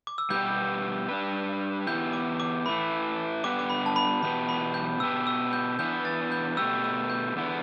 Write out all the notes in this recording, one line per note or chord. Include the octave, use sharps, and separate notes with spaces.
D6
E6
B2 G3 B3 G4 G6
G3 D4 B4
E2 E3 B3 E4 G4 G6
D6
D6
E3 A3 E4 B5
G2 D3 B3 G4 B4 D6
D6
B5
A5
B5
E2 B2 B3 G4 B4 B5
B5
G6
B2 B3 G4 B4 E6
E6
G6
E3 B3 D4 B4 G6
A6
G6
B2 A3 G4 B4 E6
E6
G6
E2 D3 B3 E4